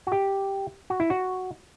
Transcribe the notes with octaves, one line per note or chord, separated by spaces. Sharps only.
F#4
G4
F#4
E4
F#4